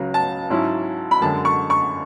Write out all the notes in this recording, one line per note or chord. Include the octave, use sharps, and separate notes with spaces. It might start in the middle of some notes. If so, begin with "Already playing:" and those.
Already playing: C#2 C#3 F#3
A5
G#2 F#3 C#4 E4
B5
F#2 D3 G#3 A5
C#6
C#6